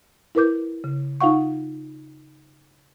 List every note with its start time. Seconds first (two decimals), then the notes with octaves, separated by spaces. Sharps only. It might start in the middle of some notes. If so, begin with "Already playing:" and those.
0.35 E4 A#4 B4 D6 G6
0.84 C#3
1.21 D#4 F4 F5 F#5 C#6